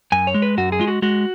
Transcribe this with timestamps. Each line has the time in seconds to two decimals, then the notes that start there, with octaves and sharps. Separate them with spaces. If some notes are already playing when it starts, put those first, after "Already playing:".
0.12 F#2 G#5
0.27 C#5
0.34 G#3
0.42 B4
0.57 F#2 F#4
0.72 G#4
0.80 G#3 F4
0.88 F#4
1.02 G#3 F#4